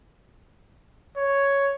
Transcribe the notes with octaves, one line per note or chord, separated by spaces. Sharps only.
C#5